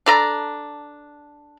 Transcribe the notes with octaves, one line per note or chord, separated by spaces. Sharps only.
D4 A4 A#5